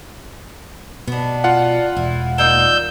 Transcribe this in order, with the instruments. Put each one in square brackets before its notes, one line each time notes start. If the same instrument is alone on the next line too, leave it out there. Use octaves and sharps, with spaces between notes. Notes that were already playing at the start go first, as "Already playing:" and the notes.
[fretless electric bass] B2 [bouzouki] B3 D4
[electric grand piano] F4 F5 F#5
[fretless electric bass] E1 [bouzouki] E4
[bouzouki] A#3 D#4 D5 [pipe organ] E6 G6